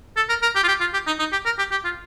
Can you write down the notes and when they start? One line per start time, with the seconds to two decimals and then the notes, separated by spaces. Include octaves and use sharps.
0.17 A4
0.29 A#4
0.42 A#4
0.55 G4
0.64 F4
0.68 G4
0.81 F4
0.93 G4
1.07 D#4
1.19 D#4
1.32 G4
1.46 A#4
1.59 G4
1.71 G4
1.85 F4